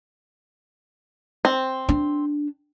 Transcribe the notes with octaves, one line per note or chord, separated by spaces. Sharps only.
C4
D4